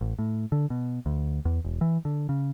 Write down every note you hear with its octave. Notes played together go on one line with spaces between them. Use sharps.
A1
A2
D3
B2
D2
E2
E1
E3
D3
C#3